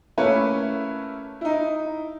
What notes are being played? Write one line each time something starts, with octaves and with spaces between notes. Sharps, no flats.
A3 A#3 C#4 E4 B4 C#5
D#4 E4